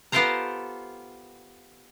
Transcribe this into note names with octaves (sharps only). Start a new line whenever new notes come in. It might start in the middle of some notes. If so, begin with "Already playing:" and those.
B3 F4 G4 A4 C5 A#5